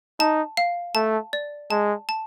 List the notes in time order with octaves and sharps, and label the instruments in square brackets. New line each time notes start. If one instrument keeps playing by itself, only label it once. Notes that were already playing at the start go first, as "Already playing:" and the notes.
[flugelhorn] D#4 [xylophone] A5
[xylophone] F5
[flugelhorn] A3 [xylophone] A5
[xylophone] D5
[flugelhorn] G#3 [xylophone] A5
[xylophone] A5